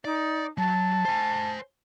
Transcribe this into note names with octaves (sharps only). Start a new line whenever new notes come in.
D#4 D5
F#3 A5
C5 G#5